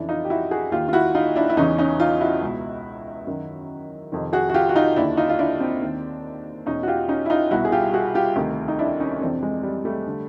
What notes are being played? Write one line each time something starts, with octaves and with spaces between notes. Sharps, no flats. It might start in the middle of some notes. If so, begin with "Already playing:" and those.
Already playing: F2 C#3 E3 D4 E4
D#4 F4
G4
E4 F#4
F#4 G#4
D#2 D#3 F4 G4
F4
E4 F#4
D#4 F4
D4 E4
E4
E2 C#3 E3 C#4 D#4
C#4 D#4
D#4 F4
E4 F#4
C#2 B2
F#2 D#3
F2 C3 D#3
F#4 G#4
F#4
F4 G4
F#4
D#4 F4
D#2 D3 D4 E4
D#4 F4
F4
D4 E4
C4 D4
D#2 D#3
E2 B2 C#4 D#4
F#4
F4 G4
C#4 D#4
E4
D#4 F4
C2 B2 E4 F#4
G#4
F4 G4
F#4 G#4
F4 G4
D2 C3 D#3
D#4
D4 E4
C#4 D#4
F2 C3 E3 C4 D4
G#3
G3
G3 A3
D3